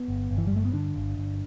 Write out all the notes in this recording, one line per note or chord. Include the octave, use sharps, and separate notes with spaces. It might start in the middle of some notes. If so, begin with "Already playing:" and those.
Already playing: B3
G1
G1
E3
G3
G2 A3
B3
D3 D4
G1
G1